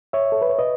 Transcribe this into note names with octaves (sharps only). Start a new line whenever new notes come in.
C#5 E5
A4
B4
C#5
B4 D#5